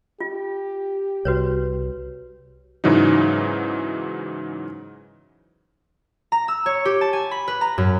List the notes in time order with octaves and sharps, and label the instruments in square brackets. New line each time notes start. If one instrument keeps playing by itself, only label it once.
[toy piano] F4 [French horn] G4
[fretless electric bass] C2 [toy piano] F#4 B4 C#5
[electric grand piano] G#2 C#3 E3 F#3 D#4
[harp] A#5
E6
C#5
G4
A5
G#5
B5
B4
A#5
F#2